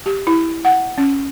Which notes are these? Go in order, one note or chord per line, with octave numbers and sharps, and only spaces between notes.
G4
E4
F#5
C#4